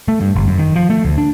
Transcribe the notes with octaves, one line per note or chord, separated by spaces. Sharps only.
A3
G2
G1
F#2
D#3
F3
A3
D2
D4